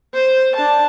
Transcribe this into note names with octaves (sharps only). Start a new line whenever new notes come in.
C5
D4 A5